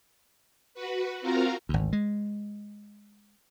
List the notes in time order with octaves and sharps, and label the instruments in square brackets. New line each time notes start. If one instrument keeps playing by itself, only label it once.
[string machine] F#4 B4
C4 F4 F#4 A#4 F5 A#5
[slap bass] G#1 D2
G#3